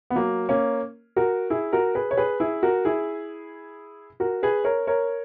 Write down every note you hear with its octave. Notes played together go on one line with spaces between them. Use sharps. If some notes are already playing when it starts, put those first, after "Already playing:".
B3
F#3 A#3
A#3 C#4
F#4 A#4
E4 G#4
F#4 A#4
G#4 B4
C#5
G#4 B4
E4 G#4
F#4 A#4
E4 G#4
F#4 A#4
G#4 B4
A#4 C#5
A#4 C#5